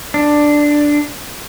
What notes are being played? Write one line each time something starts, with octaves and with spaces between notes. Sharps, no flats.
D4